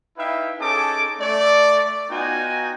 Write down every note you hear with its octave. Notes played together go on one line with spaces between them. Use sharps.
D#4 E4 B4 E5 F5 G5
C#4 D#4 G#4 A4 A5 D6
A3 D5
B3 D#4 F4 F#4 G5 G#5